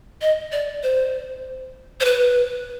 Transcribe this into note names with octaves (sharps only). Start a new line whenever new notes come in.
D#5
D5
C5
C5
B4